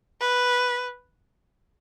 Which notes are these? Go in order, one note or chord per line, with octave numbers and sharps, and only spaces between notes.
B4